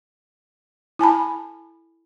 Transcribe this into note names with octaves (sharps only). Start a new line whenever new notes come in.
E4 G#5 A5 B5